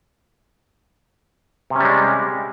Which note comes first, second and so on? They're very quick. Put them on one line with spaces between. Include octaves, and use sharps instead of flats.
C3 C#4 G3 G#3